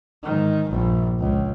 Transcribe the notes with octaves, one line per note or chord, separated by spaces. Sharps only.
G#2 D#3
A#1 G2
C#2